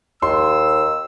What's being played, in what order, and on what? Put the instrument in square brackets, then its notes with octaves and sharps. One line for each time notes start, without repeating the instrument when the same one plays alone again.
[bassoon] D#2 [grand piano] C6 [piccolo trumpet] E6